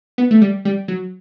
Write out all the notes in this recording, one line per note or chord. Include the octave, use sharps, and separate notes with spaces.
B3
A3
G3
G3
F#3